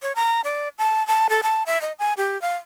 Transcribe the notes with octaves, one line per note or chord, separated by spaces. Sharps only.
C#5
A#5
D5
A5
A5
A4
A5
E5
D#5
G#5
G4
F5